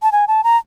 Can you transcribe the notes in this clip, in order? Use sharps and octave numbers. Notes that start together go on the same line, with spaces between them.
A5
G#5
A5
A#5